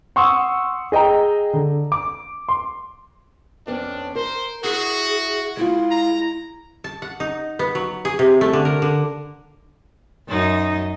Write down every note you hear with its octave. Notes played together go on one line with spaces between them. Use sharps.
F#5 C6 C#6 D#6 E6
G#4 D#5 G5 A#5
D3
D6
C6
F2 B3 C#4 D4
A#4 C5
E4 F#4 G#4
G#3 E4 F4
A#5
A5
F#5
D#4
B3
F#3
G#4
C3
A3
D3
A#4
D3
F#2 D#4